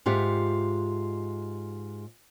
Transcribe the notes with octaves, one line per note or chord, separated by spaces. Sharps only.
G#2 F4 G4 E5 F#5